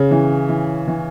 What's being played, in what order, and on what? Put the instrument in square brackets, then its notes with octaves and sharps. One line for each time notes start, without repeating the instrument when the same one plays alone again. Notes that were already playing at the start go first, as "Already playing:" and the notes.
Already playing: [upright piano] C#3 [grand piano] C#4
[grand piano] E3
E3
E3